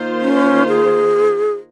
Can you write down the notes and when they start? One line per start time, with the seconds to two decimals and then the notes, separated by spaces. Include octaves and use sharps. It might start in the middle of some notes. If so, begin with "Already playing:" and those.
Already playing: D#3 A#3 F4 C5
0.21 C#4
0.68 G#4